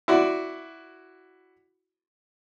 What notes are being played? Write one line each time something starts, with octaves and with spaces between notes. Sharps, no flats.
E4 F#4 D5